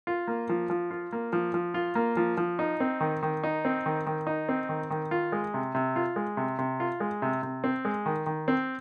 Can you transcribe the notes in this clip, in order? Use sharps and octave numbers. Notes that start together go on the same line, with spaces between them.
F4
A#3
F3
F3
F4
A#3
F3
F3
F4
A#3
F3
F3
D#4
C4
D#3
D#3
D#4
C4
D#3
D#3
D#4
C4
D#3
D#3
F4
G#3
C3
C3
F4
G#3
C3
C3
F4
G#3
C3
C3
C4
G#3
D#3
D#3
C4